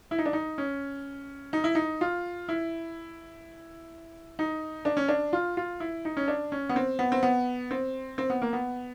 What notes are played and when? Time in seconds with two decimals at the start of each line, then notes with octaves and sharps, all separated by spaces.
0.11 E4
0.18 D#4
0.26 D4
0.33 D#4
0.58 C#4
1.53 D#4
1.64 E4
1.75 D#4
2.01 F4
2.49 E4
4.39 D#4
4.85 D4
4.97 C#4
5.08 D4
5.33 F4
5.57 F4
5.80 E4
6.05 D#4
6.17 C#4
6.28 D4
6.52 C#4
6.69 B3
6.76 C4
6.99 B3
7.12 C4
7.23 B3
7.71 C4
8.18 C4
8.30 B3
8.42 A#3
8.53 B3